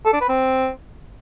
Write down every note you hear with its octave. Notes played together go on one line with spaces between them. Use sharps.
A4
D4
B4
C4